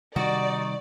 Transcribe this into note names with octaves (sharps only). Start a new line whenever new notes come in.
C3 D#3 G3 D#4 F#4 D5